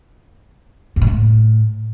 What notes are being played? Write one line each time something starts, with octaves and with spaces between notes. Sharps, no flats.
F2
B2
A2